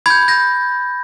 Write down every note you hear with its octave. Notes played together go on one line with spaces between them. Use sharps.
B5 G6 G#6
G6 A#6